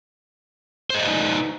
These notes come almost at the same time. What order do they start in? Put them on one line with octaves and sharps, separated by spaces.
C5 D#5 D5 B4 D#4